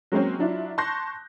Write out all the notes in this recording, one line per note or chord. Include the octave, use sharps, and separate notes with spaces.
F#3 G#3 A#3 C4 C#4
F#3 D4 E4 F4
A5 C6 C#6 F#6 G6 A#6